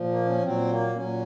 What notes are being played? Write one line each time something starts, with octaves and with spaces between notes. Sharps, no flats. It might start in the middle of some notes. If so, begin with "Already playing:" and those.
Already playing: A#2 F3
A#3
C#4
A#2 F#3 C4
A#3
A#2 F#3 C#4